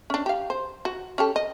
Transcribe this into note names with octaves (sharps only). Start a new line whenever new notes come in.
C#4 D4
G4 F5
C5
F#4
C#4 G4 A4
D#5